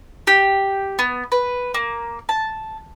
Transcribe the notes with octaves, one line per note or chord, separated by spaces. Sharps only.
G4
B3
B4
A#3
A5